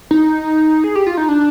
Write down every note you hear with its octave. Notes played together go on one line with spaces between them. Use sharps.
D#4
G#4
G4
F4
D#4
D4